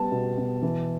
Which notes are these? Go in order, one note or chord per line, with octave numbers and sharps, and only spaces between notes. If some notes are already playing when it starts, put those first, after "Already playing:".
Already playing: G3 B3 A5
B2
B2
E3